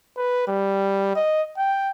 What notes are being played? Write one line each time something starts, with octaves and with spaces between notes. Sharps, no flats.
B4
G3
D#5
G5